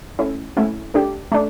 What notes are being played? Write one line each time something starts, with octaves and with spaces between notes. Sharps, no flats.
A3 C#4 E4
A3 C#4 E4
A3 D4 G4
A3 D4